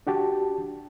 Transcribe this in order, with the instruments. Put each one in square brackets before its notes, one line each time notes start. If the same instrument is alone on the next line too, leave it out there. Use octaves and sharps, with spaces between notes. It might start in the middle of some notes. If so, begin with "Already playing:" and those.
[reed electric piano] D4 F#4 G4 A5